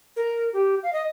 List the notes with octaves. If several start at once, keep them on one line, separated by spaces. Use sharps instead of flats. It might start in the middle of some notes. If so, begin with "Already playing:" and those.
A#4
G4
F5
D#5